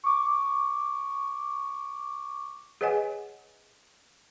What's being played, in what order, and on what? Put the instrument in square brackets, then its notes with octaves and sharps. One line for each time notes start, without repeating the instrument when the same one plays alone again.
[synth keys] C#6 D6
[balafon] G#4 B4 C#5 D#5 F#5 G#5